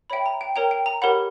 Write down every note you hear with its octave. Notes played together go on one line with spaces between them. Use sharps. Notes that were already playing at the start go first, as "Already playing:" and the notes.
C#5 E5 G5 B5
A#5
G5
A#4 C#5 G5 A#5
G5
A#5
G4 A#4 C#5 F#5 B5